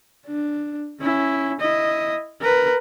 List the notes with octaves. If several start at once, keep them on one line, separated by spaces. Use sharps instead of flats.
D4
C#4 E4
E4 D#5
A#4 B4